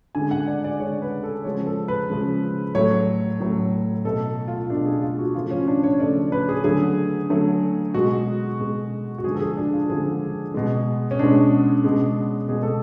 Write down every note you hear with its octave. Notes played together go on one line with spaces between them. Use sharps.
D3 G#3 G#5
F#5
D5
D5
D3 G#3 C#5
B4
A4
C#3 F3 G#3 C#5
A4
B4
C#3 F3 G#3
A2 F#3 A3 C#5
A2 F#3 A3
B2 A3 A4
F4
B2 A3 D4
G#4
F4
F#4
C#3 F3 A3 F4
C#4
D4
C#5
C#3 F3 A3 D5
B4
G#4
D3 F#3 A3 G#4
D3 F#3 A3
B2 G#3 F#4
B2 G#3
F#4
D3 F3 G#3 G#4
A4
G#4
D4
F4
D3 F3 G#3 G#4
B2 G#3
C#4
B2 G#3 D4
B2 G#3
B2 G#3 G#4
A4